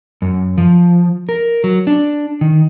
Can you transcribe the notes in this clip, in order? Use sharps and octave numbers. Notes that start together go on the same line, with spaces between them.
F#2
F3
A#4
F#3
D4
D#3